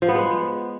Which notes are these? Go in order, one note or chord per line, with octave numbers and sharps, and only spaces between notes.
F3
B3
G#3